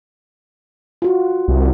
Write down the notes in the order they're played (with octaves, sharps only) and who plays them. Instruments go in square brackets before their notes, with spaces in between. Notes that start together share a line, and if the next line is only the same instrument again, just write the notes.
[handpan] F4 F#4
[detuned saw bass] C2